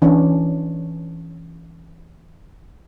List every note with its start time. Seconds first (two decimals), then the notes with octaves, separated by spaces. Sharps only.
0.02 E3 C#4 D4